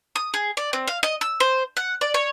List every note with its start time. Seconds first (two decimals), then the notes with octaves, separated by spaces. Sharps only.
0.16 D#6
0.34 G#4
0.57 D5
0.73 C4
0.88 F5
1.03 D#5
1.21 E6
1.40 C5
1.77 F#5
2.01 D5
2.14 C#5